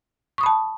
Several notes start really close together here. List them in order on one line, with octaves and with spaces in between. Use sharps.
C#6 D#6 B5 A5